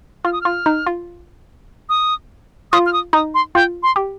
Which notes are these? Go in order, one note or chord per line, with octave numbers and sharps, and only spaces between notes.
F4 F6
D#6
F4 F6
D#4
F4
D#6
F4 D#6
F6
D#6
D#4 D#6
C6
F4 G5
C6
G4